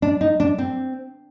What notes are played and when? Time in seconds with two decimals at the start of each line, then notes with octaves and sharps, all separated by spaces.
0.02 D4
0.21 D#4
0.40 D4
0.58 C4